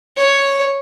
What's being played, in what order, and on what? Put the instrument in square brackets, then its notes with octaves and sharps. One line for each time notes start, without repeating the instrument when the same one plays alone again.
[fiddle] C#5